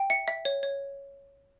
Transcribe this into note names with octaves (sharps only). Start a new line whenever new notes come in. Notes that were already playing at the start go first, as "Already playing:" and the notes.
Already playing: G5
E5 C#7
E5
C#5
C#5